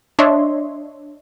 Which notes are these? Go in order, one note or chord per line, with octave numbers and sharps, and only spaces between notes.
D4 C#5 D#5 E5 C6